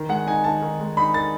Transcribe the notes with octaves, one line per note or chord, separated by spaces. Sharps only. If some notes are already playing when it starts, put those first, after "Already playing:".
Already playing: D#3
G#3 F#5
D#4 G#5
D#3 A5
D#3
G#3
D#4 B5
D#3 A6